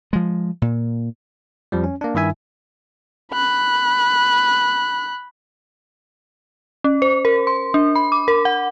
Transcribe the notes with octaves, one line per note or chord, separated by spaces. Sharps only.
F3 G#3
A#2
F2 F3 G3
C#4
A#3 D4
G2 D#3 E4 E5 G#5
B5 F#6
C#4
C5
A#4
C6
D4
B5
D6
A#4
F#5